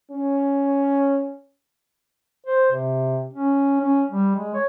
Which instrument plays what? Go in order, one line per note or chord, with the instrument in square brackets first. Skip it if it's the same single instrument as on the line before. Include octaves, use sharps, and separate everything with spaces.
[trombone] C#4
[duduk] C5
C3
C#4
C#4
G3
G#3
C#5